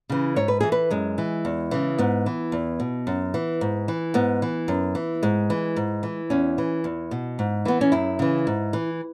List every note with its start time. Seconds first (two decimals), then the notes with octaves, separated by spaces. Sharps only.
0.09 C#3 E3
0.36 G#2 C#5
0.48 B4
0.60 E3 G#4
0.72 B4
0.90 F#2 G#3
1.18 E3
1.45 E2
1.71 C#3 E3
1.98 G#2 B3
2.26 E3
2.52 E2
2.80 B2
3.07 F#2
3.34 E3
3.61 G#2
3.88 E3
4.14 G#2 B3
4.42 E3
4.68 F#2
4.95 E3
5.23 G#2 G#3
5.50 E3
5.76 G#2
6.03 E3
6.30 E2 C#4
6.58 E3
6.84 E2
7.11 B2
7.39 G#2
7.65 E3 B3
7.81 C#4
7.92 F#2 E4
8.19 C#3 E3
8.47 G#2
8.73 E3